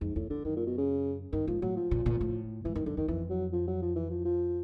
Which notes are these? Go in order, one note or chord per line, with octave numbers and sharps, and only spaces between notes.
F2 G#2
E2 A2
F2 D3
F#2 D#3
A#2
B2
C#3
G2 D#3
G#2 F3
A2 F#3
F3
A#2
A#2
A2
G#2 E3
F#2 D#3
F2 D3
E2 D#3
F2 E3
F#3
F3
F#3
F3
E3
F3
F3